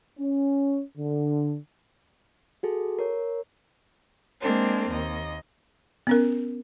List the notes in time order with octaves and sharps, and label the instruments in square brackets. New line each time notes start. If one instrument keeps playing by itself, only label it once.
[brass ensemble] C#4
D3
[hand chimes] F#4 G#4 A4
A#4 C#5
[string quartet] G#3 A#3 C4 D4
D#2 D#5
[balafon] B3 C#4 A#4